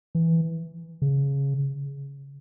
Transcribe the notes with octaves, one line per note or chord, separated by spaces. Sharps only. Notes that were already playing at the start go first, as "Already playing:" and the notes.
E3
C#3